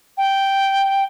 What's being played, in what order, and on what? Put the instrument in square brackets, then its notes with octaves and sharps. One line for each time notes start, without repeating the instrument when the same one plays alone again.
[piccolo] G5